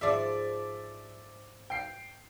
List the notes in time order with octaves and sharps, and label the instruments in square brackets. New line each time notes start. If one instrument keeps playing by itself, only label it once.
[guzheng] G#2 F3 [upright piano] D5 E5
[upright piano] G5 C7